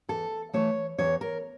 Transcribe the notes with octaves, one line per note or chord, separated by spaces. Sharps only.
E2 A4
E3 A3 C#5
E2 C#5
A#4